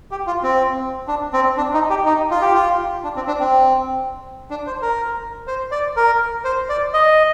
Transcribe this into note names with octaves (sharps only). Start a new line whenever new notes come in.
G4
F4
C4
D4
C4
D4
D#4
G4
D#4
F4
G4
F4
D4
C4
D4
C4
D4
C5
A#4
C5
D5
A#4
C5
D5
D#5